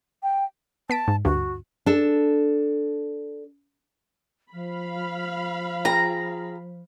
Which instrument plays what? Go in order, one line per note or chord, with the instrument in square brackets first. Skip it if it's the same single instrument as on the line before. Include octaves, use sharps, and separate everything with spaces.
[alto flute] G5
[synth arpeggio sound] B3 B6 D7 [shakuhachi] A5
[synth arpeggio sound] G#2
[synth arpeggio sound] D2 G2 [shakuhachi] F#4
[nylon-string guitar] D4 A4
[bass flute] F3 [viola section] F5 B5
[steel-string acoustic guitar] F4 G#4 G5 [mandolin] A#5